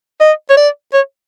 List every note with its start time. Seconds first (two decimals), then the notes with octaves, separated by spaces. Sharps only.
0.21 D#5
0.50 C#5
0.57 D5
0.93 C#5